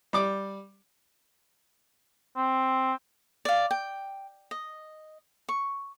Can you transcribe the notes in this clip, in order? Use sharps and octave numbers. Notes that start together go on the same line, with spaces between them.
G3 D6
C4
D5 F5
G5
D#5
C#6